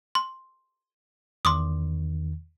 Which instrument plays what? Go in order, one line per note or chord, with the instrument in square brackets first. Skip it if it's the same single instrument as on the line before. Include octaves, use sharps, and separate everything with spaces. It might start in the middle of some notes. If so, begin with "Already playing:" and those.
[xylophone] C6
[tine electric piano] E2 D#3 [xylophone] C6 D6 D#6